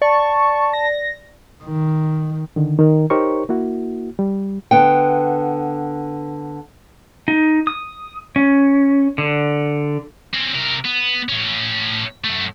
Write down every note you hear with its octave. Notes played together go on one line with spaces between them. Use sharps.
D5 A5 C#6
A#6
D#3
D3 D#3
D#3 A#4
D#4 G4 A#4 C5 C#5 C#6
A#3 E4 F#4
G3
D3 B3 G5
D#4
D#6
C#4
D3
C4 C#4
C3 A#4
B3
A2 C#4
F#2 A3